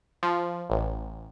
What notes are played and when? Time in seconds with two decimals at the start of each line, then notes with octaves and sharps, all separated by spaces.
0.23 F3
0.70 A1